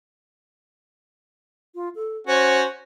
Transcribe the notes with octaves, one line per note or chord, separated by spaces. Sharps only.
F4
A4
C#4 F#4 C5